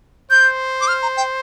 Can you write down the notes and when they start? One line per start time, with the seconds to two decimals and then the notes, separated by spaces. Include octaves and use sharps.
0.31 C5 G6
0.81 D6
0.88 F6
1.03 A#5
1.17 G5